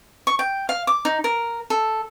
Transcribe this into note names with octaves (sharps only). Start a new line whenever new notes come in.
C#6
G5
F5
D6
D#4
A#4
A4